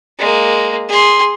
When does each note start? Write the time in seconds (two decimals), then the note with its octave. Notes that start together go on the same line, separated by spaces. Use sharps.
0.19 G#3 A#3
0.89 G#4 C6